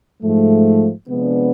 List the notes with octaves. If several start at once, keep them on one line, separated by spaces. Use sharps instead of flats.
G#2 F3 A3
C3 F3 G#3 B3 D4